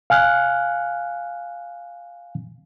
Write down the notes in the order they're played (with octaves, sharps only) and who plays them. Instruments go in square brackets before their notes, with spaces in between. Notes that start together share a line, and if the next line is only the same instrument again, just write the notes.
[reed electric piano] F5 G#5 F6 F#6